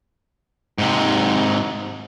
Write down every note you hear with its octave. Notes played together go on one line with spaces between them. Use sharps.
G#2 C3